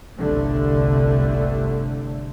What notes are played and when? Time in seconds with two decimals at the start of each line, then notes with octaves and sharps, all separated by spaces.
0.17 G1 C2 D3 A3